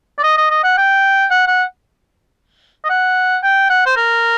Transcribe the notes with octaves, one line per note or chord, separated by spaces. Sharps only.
D5
D#5
D#5
D#5
F#5
G5
F#5
F#5
D#5
F#5
G5
F#5
C5
A#4